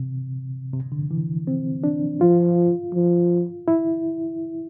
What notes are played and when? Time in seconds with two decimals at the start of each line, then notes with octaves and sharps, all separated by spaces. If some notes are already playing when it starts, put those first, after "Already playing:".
Already playing: C3
0.73 C3
0.92 D3
1.11 E3
1.47 C4
1.84 D4
2.21 F3 F4
2.94 F3
3.68 E4